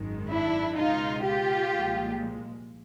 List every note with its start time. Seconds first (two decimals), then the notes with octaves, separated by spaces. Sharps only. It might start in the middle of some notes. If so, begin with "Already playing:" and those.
Already playing: G#1 F#2 D#3 G#3
0.28 D4 E4
0.76 C#2 B2 G#3 D#4 F4
1.24 F4 G4
1.71 C2 A#2 F3 G#3